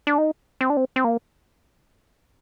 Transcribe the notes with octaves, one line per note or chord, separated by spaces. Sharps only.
D4
D#4
C4
D4
C4
C4
A#3